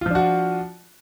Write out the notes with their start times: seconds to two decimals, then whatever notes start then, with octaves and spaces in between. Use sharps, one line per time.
0.01 F4
0.06 F3
0.10 D4
0.15 F#4